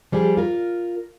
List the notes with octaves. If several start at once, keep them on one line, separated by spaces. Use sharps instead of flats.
F3 G3 G4 G#4
F4 A#4